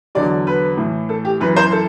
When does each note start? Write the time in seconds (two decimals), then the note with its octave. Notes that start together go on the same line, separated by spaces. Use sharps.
0.15 E2 D3 F#3 D5
0.47 B4
0.77 A2 E3
1.09 A4
1.25 G4
1.40 F#2 E3 B4
1.56 C5
1.72 A4